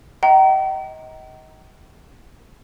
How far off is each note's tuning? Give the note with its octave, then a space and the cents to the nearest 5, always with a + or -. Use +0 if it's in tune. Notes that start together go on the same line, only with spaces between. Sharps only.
D#5 +30 G5 -45 A#5 +0